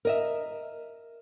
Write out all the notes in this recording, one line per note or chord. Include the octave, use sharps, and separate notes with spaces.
A#4 D#5 E5